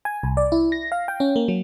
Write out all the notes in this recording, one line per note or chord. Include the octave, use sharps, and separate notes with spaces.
G#5
C2
D5
E4
A#6
F5
G5
C#4
A#3
F#3